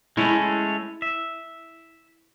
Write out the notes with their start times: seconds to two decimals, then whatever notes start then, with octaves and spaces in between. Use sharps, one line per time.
0.17 G#3 A3 C#4 E4
1.02 E5